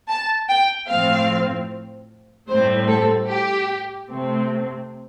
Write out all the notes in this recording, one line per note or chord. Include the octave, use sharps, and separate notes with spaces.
A5
G5
A2 F3 C4 F5
A2 G3 C4 C5
A4
G4
C3 A3 C4